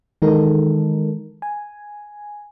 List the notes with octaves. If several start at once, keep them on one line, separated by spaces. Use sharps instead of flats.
D#3 E3 G#3 D#4 A4 A#4
G#5